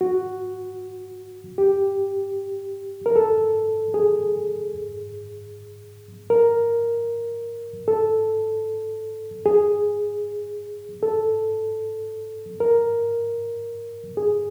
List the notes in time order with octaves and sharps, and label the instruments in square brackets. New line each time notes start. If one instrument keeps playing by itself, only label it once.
[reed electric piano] F#4
G4
A#4
A4
G#4
A#4
A4
G#4
A4
A#4
G#4